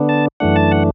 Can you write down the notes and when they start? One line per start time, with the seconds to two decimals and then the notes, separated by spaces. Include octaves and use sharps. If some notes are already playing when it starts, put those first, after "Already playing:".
Already playing: D3 B3 D4
0.09 A5
0.40 F#2 E3 A3 D4 F#5
0.56 A5
0.72 F#5